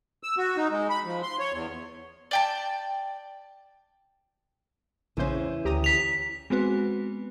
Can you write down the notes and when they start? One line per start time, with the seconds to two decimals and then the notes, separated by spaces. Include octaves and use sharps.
0.23 E6
0.38 F#4
0.57 D#4
0.71 G#3
0.89 B5
1.05 F3
1.23 C6
1.39 C#5
1.53 E2
2.31 D5 G5 A5
5.17 A#1 E2 C#3 E3 C#4 C5
5.65 D2 G4 A#5 D#6
5.84 B6 F7
6.50 G#3 B3 C4 F#4 B4